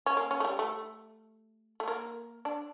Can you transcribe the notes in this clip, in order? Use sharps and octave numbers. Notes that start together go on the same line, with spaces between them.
C#4
A#3
C#4
A3
G3
A3
A3
A#3
D4